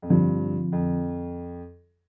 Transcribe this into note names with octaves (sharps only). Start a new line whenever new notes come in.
F2
G2 D3 F3 C4 F4
F2